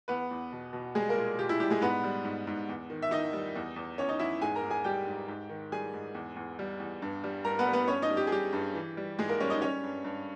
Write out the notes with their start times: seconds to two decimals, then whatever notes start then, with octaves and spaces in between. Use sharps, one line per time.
0.08 E2 B3 B4
0.31 E2
0.52 B2
0.73 B2
0.95 G3 G#3 G#4
1.09 A#3 A#4
1.16 A#2
1.39 A#2 G4
1.49 E4
1.60 G3 G4
1.70 G#3 G#4
1.81 G#2 B3 B4
2.04 G3
2.24 G#2
2.47 G#2
2.69 E2
2.90 D#3
3.02 E5
3.11 D#3 D#4 D#5
3.33 G3
3.56 E2
3.76 E2
3.98 E2 C#4 C#5
4.09 D#4 D#5
4.19 E2 E4 E5
4.41 G#2 G#4 G#5
4.56 A#4 A#5
4.63 G#2
4.70 G#4 G#5
4.84 G3 G4 G5
5.07 G#2
5.28 G#2
5.49 D#3
5.72 G3 G#4 G#5
5.93 G#2
6.15 E2
6.36 E2
6.59 G3
6.80 E2
7.02 G2
7.24 G3
7.45 G2 A#4 A#5
7.59 B3 B4
7.67 G3
7.73 B3 B4
7.88 G2 C#4 C#5
8.02 D#4 D#5
8.10 G3
8.17 G4
8.27 G#4
8.32 G3 G4
8.53 G2
8.75 E3
8.97 G3
9.19 G#2 G#3 G#4
9.29 A#3 A#4
9.40 G3 C#4 C#5
9.50 D#4 D#5
9.62 G3 C#4 C#5
9.83 G2
10.04 G2